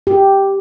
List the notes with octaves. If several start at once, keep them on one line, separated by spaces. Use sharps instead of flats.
G4